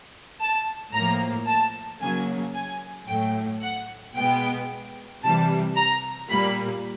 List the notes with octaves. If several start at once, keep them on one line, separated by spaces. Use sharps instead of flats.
A5
A2 F3 A#3 A#5
A5
C#3 F#3 A#3 G#5
G#5
A2 F#3 A3 G5
F#5
B2 G#3 B3 G5
C3 E3 G3 A5
A#5
A#2 G3 A#3 B5